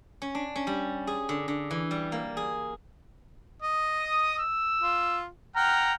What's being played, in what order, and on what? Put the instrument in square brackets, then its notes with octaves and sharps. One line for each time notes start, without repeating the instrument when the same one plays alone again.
[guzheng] C#4
D4
C#4
G3
G#4
D3
D3
E3
G3
A#3
G#4
[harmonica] D#5
[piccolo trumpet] D#6
E6
[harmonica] F4
[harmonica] F#5 G5 F6 [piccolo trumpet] A#5